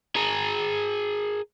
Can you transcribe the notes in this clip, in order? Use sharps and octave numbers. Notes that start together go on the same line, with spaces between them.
G#4 A#4